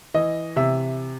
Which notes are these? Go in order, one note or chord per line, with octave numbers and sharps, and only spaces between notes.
E3 D#5
C3 E5